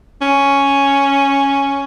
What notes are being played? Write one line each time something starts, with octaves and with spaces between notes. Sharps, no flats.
C#4